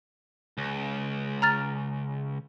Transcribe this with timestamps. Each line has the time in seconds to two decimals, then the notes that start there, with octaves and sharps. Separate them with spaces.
0.58 C#2
1.42 A#5 F6 A6